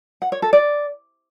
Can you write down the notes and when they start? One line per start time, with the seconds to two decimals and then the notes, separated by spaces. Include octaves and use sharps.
0.22 F#5
0.32 C#5
0.42 A4
0.53 D5